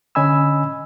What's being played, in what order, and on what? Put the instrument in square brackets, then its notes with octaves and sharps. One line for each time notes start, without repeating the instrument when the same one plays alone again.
[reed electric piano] D3 C#4 D#5 G#5 B5 E6